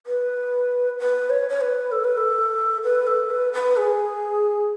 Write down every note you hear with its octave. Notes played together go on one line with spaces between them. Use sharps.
B4
B4
C#5
C#5
B4
A4
B4
A4
B4
A4
B4
B4
G#4